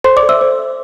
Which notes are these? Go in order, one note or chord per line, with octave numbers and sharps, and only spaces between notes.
A4 C5 C6
D5 D6
A4
E5 E6
C5
E5